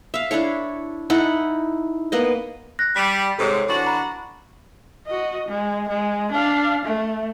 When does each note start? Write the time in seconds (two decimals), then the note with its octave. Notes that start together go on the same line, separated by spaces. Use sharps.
0.14 E5 F5
0.31 D4 E4 A4 C#5
1.10 D#4 E4 A4 F#5
2.12 A#3 B3 D#5
2.79 F#6 A#6
2.96 G3 B6
3.38 G#2 C3 A4 C5 C#5
3.68 E3 D4 F#4
3.87 A#5 B5
5.07 F#4 D#5
5.48 G#3
5.88 G#3
6.31 D4 F5
6.85 A3